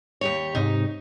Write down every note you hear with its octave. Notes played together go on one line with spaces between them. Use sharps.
D#2 G4 C#5
G#2 C3 D#4